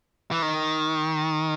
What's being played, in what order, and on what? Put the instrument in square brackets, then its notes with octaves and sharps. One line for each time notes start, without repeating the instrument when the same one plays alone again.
[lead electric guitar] E3
D#3